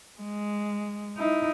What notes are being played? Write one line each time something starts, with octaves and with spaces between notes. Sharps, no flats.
G#3
D#4 E4